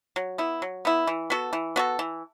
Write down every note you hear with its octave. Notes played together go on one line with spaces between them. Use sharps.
F#3
B3 E4
F#3
B3 E4
E3
B3 F#4 A4
E3
B3 F#4 A4
E3